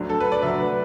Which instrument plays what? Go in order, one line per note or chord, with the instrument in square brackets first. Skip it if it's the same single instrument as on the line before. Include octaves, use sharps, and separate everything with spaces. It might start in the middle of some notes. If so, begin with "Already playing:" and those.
Already playing: [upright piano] D2 D3 F#3
A4
B4
D5
D2 D3 F#3 E5
B4